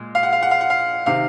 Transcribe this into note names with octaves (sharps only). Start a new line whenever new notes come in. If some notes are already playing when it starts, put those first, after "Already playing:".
Already playing: A#2 G#3
F5
F#5
F5
F#5
F5
F#5
F5
C3 D#3 F5